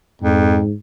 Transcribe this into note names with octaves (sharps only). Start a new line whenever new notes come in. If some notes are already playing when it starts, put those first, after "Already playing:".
F2 G#2